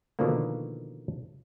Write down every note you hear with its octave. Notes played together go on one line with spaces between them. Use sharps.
B2 D3 D#3 F3 A#3